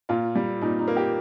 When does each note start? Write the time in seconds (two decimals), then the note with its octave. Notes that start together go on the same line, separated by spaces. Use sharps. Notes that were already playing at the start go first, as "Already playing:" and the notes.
0.09 A#2 F4
0.35 G3
0.61 A#2 D#4
0.79 D#4
0.87 A#3
0.96 G4